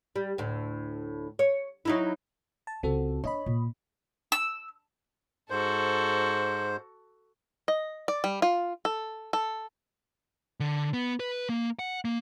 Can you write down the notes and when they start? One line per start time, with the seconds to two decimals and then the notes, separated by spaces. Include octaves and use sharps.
0.16 G3
0.38 D2 A2
1.39 C#5
1.85 F#3 D#4 E4
2.67 A5
2.83 C#2 C4 F#4 A4
3.24 D4 C#5 D#5 B5
3.46 A#2
4.32 E6
5.50 G#2 F#4 A4 C5
7.68 D#5
8.08 D5
8.24 G3
8.42 F4
8.85 A4
9.33 A4
10.60 D3
10.94 B3
11.20 B4
11.49 A#3
11.79 F#5
12.05 A#3